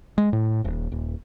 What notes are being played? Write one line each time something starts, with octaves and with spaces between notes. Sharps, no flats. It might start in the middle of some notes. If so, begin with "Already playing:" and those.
G#3
A2
D#1
D#1